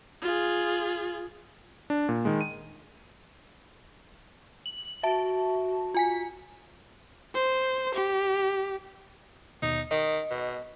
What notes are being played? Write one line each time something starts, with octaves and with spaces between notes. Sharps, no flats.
F4 G#4
D4
A#2
D#3 G#3
D#7
F#7
F#4 E5 A5
F4 G#5 B6
C5
G4
D#2 B2 D#4
D#3 D#5
B2